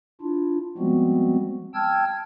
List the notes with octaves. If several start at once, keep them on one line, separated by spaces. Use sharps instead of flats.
D4 E4 F4
F3 G3 G#3 B3 C4 F#4
G5 A5 E6 F6 G#6